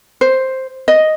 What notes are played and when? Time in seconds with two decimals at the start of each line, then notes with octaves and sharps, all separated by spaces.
0.21 C5
0.88 D#5